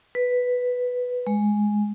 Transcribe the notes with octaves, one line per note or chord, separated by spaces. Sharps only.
B4
G#3